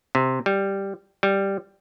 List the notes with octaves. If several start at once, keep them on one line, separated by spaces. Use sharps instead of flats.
C3
G3
G3